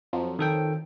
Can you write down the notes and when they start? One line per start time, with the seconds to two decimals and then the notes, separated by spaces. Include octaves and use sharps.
0.13 F2 F3 F#3
0.39 D#3 A4 G5